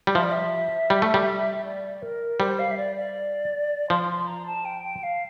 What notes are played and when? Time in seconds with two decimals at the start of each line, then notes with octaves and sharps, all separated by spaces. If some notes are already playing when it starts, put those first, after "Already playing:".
0.07 G3
0.15 F3 E5
0.23 D5
0.31 E5
0.90 G3
1.02 A3
1.14 G3
1.55 E5
1.65 D5
2.02 A#4
2.40 G3 C5
2.59 F5
2.71 E5
2.77 D5
2.96 D5
3.90 F3 C6
4.10 C6
4.27 A#5
4.46 A5
4.65 G5
4.84 G5
5.03 F5